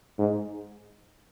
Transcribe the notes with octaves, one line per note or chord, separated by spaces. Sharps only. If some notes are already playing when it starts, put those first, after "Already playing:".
G#2